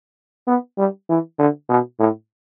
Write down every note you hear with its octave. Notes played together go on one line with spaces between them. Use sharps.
B3
G3
E3
D3
B2
A2